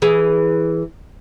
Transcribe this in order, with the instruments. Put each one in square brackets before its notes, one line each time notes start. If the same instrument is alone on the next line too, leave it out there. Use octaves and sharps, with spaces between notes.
[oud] E3 G#4